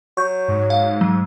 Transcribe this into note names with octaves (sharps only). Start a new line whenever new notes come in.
F#3 C#6 G6
G#2
F5
F#3